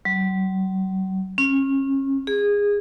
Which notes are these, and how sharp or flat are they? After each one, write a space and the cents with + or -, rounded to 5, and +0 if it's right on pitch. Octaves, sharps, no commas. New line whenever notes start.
F#3 +40
C#4 -30
G#4 -20